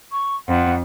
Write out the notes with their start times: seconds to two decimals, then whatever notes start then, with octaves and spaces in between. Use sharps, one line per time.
0.12 C#6
0.48 F2 F#5